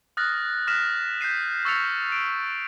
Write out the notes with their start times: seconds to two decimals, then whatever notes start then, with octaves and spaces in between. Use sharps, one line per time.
0.17 D#6 F6 F#6 A6 A#6
0.67 D#6 F6 F#6 A#6 B6 E7
1.21 G6 B6 C7 D#7
1.65 C#6 E6 A6 A#6 C#7 F7
2.12 D7